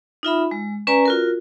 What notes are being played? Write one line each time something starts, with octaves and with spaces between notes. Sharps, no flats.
D#4 F4 E5 B5
G#3
C#4 B4 D5 G#5 A#5
F4 F#4 A#4